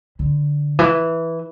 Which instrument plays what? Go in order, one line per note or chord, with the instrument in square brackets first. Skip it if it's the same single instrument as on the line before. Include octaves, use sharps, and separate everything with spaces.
[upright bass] D3
E3